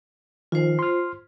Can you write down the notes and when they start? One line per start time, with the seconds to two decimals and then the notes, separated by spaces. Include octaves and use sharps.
0.52 D#3 F3 F4 C5
0.79 C6 F6